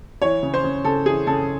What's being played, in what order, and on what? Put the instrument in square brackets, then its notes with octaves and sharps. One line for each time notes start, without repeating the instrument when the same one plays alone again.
[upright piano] E3 C#5
C#3
C5
C#3
C#3 A4
E3 G#4
C#3 A4